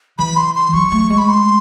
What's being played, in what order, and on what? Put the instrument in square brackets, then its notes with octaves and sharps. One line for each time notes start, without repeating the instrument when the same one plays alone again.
[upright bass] E3 [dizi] B5
[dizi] C6
C6
[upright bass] F#3 [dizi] C#6
[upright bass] A3
G#3
[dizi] B5
C6